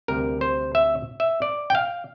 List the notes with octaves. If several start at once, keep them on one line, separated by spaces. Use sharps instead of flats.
D2 C3 G3 A#4
C5
E5
E5
D5
G5
F5